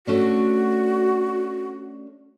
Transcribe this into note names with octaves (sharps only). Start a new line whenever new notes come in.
A3 C#4 D4 F#4